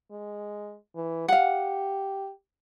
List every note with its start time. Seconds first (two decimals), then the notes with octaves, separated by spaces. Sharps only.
0.12 G#3
0.96 E3
1.28 G4 F5 F#5